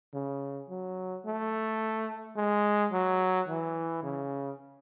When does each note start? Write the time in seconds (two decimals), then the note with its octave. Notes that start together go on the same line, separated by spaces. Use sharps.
0.14 C#3
0.70 F#3
1.26 A3
2.36 G#3
2.92 F#3
3.48 E3
4.03 C#3